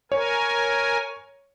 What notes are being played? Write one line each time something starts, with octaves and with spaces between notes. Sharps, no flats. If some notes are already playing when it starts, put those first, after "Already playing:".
A#4 C#5 G#5